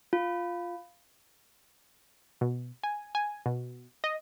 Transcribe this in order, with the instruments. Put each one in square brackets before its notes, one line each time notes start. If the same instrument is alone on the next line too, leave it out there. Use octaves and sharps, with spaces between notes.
[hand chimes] F4
[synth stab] B2
G#5
G#5
B2
D#5